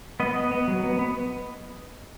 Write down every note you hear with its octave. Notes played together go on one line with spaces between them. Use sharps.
B3 D#5
B3
B3
F#3
B3
B3